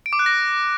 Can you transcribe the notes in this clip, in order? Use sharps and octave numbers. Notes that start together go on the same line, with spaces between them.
D7
D6
F#6
A#6